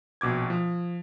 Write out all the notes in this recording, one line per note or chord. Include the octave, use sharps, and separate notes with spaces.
A#1 B2 D6 G#6
F3